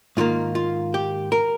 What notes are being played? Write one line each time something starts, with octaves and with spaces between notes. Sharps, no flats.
G#2 D#3 A#3 F4
F4
G4
A#4